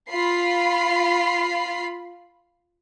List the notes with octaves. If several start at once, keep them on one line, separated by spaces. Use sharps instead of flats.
F4 B5 C7